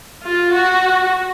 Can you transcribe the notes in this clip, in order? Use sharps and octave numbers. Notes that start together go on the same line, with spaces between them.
F4
F#4